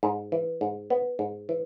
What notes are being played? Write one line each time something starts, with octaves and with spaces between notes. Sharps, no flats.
G#2
E3
G#2
B3
G#2
E3